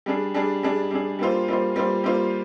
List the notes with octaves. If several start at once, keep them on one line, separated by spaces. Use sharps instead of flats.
G3 D4 G#4
G3 D4 G#4
G3 D4 G#4
G3 D4 G#4
G3 A#3 F4 C5
G3 A#3 F4 C5
G3 A#3 F4 C5
G3 A#3 F4 C5